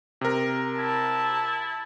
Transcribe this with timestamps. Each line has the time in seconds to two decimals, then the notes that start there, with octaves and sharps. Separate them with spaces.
0.21 C3 A#4
0.78 E4 A5